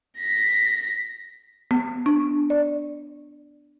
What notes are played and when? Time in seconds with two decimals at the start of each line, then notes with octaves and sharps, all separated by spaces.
0.19 A#6 B6
1.71 B3
2.06 D4
2.50 D5